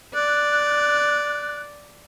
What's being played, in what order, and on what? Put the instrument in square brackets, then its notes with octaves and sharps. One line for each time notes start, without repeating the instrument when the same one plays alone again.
[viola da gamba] D5 [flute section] F#6